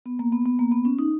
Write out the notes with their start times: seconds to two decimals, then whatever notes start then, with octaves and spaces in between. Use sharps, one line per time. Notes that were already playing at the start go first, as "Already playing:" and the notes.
0.06 B3
0.19 A#3
0.32 B3
0.46 B3
0.59 A#3
0.72 B3
0.85 C#4
0.99 D#4